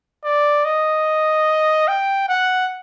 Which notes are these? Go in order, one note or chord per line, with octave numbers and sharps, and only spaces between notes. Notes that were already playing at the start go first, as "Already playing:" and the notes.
D5
D#5
G5
F#5